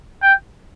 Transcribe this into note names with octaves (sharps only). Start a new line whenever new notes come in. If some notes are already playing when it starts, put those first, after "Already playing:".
G5